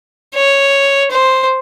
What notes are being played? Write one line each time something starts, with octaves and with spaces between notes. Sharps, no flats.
C#5
C5